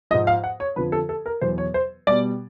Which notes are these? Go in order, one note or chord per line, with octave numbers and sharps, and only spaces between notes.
G#2 F3 D#5
F5
F#5
C#5
F2 D3 F3 B4
A4
A4
A#4
E2 B2 F#3 C5
C#5
C5
B2 G3 D5